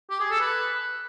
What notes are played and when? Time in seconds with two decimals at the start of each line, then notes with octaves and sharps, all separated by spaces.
0.10 G4
0.20 G#4
0.30 A4
0.41 B4